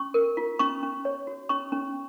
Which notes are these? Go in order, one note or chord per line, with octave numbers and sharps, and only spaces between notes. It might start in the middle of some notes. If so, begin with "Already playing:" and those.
Already playing: C#4 C#6
A#4
F4
C#4 C#6
C#4
C#5
F#4
C#4 C#6
C#4